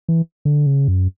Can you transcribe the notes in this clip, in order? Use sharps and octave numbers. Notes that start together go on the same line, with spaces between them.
E3
D3
C#3
F#2